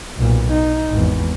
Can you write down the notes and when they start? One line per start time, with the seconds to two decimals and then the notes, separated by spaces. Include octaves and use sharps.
0.17 B1 A#2
0.52 D#4
0.90 G#1 E2